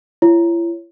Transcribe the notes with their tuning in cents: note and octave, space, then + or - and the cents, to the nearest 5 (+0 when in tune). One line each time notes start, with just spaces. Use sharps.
E4 +45 C#5 +0